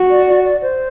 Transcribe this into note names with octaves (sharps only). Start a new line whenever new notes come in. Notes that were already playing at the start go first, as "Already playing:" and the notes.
Already playing: F#4
D5
D5
D5
C5